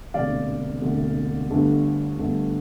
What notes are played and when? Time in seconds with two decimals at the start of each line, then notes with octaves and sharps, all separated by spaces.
0.14 E1 D2 C3 D5 F5
0.82 E1 D2 C3
1.51 G1 G2 D3 A3
2.18 G1 G2 D3 A3